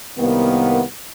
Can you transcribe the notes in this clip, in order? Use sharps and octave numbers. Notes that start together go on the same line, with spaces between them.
C2 D#3 A#3 B3